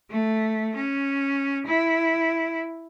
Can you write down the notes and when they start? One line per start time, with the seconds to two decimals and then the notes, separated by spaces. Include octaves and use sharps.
0.10 A3
0.75 C#4
1.66 E4